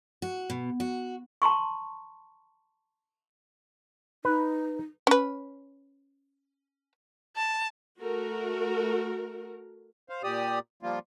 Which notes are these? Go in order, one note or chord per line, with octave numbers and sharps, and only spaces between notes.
F#4
B2
F#4
A5 A#5 C6 C#6
D#4 B4
C#4 B4
A5
A3 F#4 A#4
C5 F5
A#2 G4 D5 D#6
F3 G3 A#3 F4